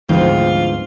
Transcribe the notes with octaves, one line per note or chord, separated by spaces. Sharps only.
D2 G#2 E3 F3 B3 C4 F4